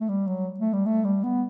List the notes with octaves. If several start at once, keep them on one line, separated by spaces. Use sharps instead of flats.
A3
G3
F#3
A3
G3
A3
G3
B3